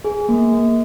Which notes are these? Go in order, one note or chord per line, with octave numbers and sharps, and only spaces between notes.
G#4
A#3
A#3